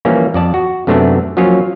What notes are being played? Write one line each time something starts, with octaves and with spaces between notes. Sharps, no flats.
E3 F3 G3 A#3 C#4
F2 D5 A5
F#4
F#2 C3 A3 B3 D4
F3 F#3 A#3 C#4 F4 C#5